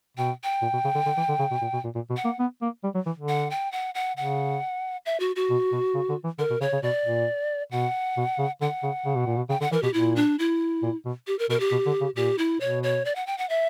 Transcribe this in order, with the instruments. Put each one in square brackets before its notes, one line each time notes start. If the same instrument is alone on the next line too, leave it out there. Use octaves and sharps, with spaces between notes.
[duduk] B2 [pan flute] G5
[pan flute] G5
[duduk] A#2
B2
C#3
D3
D3
E3
D3
C#3
B2
A#2
B2
A#2
A#2
B2
[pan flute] F#5
[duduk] A#3
B3
A#3
G3
F#3
E3
D3
[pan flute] F#5
G5
F#5
F#5
[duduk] C#3 [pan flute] F#5
[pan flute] E5
F#4
F#4
[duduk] B2
B2
C#3
D3
E3
[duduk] D3 [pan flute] A#4
[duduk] B2
[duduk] C#3 [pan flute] C#5
[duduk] C#3
[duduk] B2 [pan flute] D5
[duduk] A#2
[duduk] B2 [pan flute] F#5
[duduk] B2
C#3
[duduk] D3 [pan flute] F#5
[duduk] C#3
C#3
B2
A#2
B2
[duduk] C#3 [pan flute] G5
[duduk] D3 [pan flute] F#5
[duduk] E3 [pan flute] A#4
[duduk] B2 [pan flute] G4
[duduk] A#2 [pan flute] E4
[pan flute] D4
E4
[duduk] A#2
B2
[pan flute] G4
A#4
[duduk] B2 [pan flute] A#4
[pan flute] G4
[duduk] B2
D3
C#3
[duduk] A#2 [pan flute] G4
[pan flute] E4
[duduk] B2 [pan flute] C#5
[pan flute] C#5
D5
F#5
G5
F#5
E5